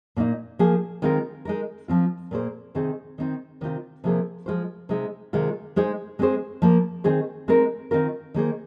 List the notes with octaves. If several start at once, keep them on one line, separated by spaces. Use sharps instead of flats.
A#2 A#3 D#4
F3 A#3 G#4
D#3 G#3 C4 F4 A#4
G#3 D#4 A#4
F3 C4 F4
A#2 A#3 G#4 C5
C3 D#3 C4 G#4 C5
D#3 C4 D#4
C3 D#3 C4 F4
C3 F3 A#3 G#4 C5
F3 G#3 F4 C5
C3 G#3 D#4
C3 D#3 G#3 F4
G#3 D#4 G#4 C5
G#3 C4 G#4 C5
F3 A#3 F4
D#3 C4 G#4 C5
G#3 C4 D#4 A#4
D#3 C4 F4 A#4
D#3 A#3 G#4 C5